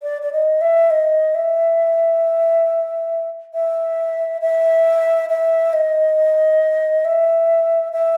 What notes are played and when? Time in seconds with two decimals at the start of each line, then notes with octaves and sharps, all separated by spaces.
0.02 D5
0.22 D5
0.32 D#5
0.61 E5
0.90 D#5
1.34 E5
3.54 E5
4.41 E5
5.29 E5
5.73 D#5
7.05 E5
7.92 E5